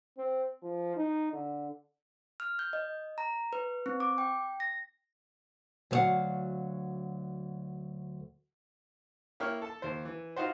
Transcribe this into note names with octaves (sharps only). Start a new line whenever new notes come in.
C4
F3
D#4
D3
F6
G6
D#5
A#5
B4
C4
D6
G5
A#6
D2 F#3 C5 C#5 F5 F#5
A#3 E4 C#5 G5 F6
A4 A5
D#2 C5
E3
D#4 F4 F#4 C5